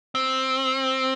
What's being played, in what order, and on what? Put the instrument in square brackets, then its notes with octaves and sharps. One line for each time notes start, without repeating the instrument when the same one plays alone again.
[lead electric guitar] C4